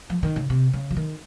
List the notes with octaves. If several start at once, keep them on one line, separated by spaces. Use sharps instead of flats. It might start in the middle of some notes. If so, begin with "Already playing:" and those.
F3
D#3
C#3
C3
C#3
F3
D#3